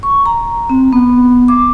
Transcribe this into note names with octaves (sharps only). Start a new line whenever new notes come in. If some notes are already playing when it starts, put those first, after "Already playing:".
C#6
A#5
C4
B3
D6